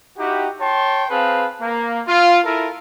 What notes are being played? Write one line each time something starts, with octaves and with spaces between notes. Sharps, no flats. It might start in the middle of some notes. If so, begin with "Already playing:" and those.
D#4 E4 F#4 G4
C#5 G5 A5 C6
C4 G#4 B4 F5 A5
A#3
F4
E4 A4 A#4